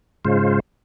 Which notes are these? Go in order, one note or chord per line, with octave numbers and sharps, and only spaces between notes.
G#2 C#3 G#3 F4 C5